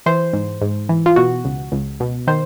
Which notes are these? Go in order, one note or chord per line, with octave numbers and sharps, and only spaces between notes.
E3 C5
G#2
G#2
E3
F4
B2 F#4
C#2
C#2
B2
D#3 C5